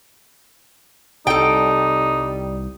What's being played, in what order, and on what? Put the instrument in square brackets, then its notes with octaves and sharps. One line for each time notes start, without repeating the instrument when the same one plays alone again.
[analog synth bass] C2 [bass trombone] G3 [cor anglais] D#4 [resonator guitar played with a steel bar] A4 G5